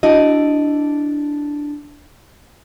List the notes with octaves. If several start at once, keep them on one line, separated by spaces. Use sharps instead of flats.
D4 E4 F#4 D#5